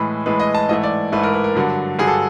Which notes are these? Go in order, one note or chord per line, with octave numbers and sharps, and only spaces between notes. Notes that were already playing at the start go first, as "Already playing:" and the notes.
Already playing: A2 E3 G#3 B4
A2 E3 G#3 B4
D#5
A5
G#2 E3 A3 D#5
D5
G#2 E3 A3 B4
A#4
B4
A#4
G2 D3 F#3
G2 D3 F#3 G#4
A4